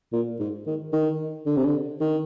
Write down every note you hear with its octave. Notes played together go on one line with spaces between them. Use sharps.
A#2
G#2
D#3
D#3
D3
C3
D3
D#3